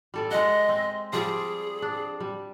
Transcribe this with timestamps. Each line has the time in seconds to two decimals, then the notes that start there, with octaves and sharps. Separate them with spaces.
0.14 G3 A4 D5
0.31 G#3 D#5 F#5
0.69 C4
1.13 F3 G3 G#4 D5
1.82 D4
2.20 G3